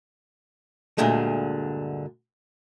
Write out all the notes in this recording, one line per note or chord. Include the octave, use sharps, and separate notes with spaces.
D2 G2 A#2 D3 G#3 A3